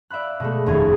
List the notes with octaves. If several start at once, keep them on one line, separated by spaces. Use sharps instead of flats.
D5 E5 F5 B5 F#6
B2 G#3 A3
F1 A#1 D#2 C#4 G#4 G#6